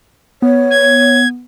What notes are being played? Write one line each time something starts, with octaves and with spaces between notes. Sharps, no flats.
B3 C#5
G#6